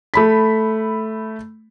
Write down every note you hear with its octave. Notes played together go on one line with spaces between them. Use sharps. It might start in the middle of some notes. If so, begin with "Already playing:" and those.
A3 B5 B6